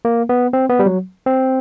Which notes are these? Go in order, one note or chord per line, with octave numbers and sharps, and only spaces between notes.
A#3
B3
C4
B3
G3
F#3
C4